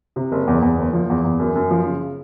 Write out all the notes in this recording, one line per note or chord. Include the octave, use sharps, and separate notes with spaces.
C3
F#1
E2
E2
F#1
F3
E2
E2
F#2
F#2
F3
C#3